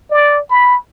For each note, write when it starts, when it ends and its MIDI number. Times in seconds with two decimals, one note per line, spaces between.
0.11 0.40 74
0.50 0.76 83